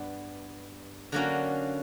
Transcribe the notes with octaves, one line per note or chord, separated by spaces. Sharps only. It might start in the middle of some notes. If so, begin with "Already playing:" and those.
Already playing: G2 G3 B3
D3 F#3 A#3 C#4 F#4